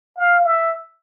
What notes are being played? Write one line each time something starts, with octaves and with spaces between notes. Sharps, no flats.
F5
E5